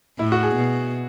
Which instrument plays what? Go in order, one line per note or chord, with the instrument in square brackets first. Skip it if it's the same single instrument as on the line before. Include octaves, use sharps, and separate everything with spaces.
[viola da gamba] A2 [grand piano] E4
[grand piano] F#4
G#4
[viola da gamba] B2